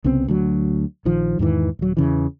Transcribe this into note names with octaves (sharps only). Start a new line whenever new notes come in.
C2 C#3 B3 C4
D2 F#3
A#1 D#3 F3
E2 G#2 D#3 E3
D#1 F#3
E2 C#3 E3